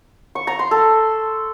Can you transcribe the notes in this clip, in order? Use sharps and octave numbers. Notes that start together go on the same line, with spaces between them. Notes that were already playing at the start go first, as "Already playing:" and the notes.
C#6
A#5
C6
A4